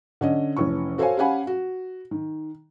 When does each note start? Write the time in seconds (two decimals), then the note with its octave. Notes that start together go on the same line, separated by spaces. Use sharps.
0.21 D3 C#4 D#5
0.57 F1 E3 C#4 C#6
0.98 F#4 A4 C5 C#5 F5 G#5
1.17 C#4 G4 F5 F#5 G#5 B5
1.47 F#4
2.11 D#3